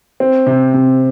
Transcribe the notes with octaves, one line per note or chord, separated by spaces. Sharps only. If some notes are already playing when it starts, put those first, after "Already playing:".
C4
C3
C3